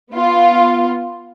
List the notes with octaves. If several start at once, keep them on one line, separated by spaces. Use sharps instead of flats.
B3 F4